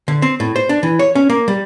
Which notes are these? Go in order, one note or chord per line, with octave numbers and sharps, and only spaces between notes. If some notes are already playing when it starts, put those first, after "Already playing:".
D3
C4
A2
C5
D4
E3
C#5
C#4
A#3
G3